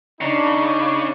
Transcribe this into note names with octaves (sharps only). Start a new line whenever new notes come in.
C#3 D4 D#4